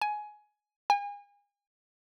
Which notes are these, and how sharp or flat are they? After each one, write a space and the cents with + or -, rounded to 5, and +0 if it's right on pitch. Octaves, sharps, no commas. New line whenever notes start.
G#5 +15
G#5 -35